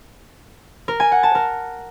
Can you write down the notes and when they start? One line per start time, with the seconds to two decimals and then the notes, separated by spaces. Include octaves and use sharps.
0.88 A#4
1.00 G#5
1.12 F#5
1.23 A5
1.35 A#4